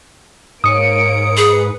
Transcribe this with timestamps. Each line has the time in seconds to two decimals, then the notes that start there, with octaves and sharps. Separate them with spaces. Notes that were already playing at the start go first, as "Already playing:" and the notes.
0.64 G#2 A#3 C#5 D#6 C#7 D7
1.37 G#4 B4